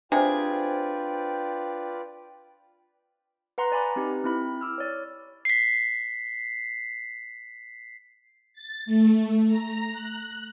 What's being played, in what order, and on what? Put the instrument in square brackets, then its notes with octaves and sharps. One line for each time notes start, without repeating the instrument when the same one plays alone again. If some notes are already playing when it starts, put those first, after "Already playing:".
[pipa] C3 G#4 [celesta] D4 C5 [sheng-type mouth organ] F4 B4 D5 [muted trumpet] G5
[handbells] B4 F#5 A#5 C6
D5 G#5 B5 D6
C4 D#4 G4 B4
C4 E4 B5
D6 E6 F6
C#5 D5
[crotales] B6 C7
[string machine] A6
A3
A#5
F#6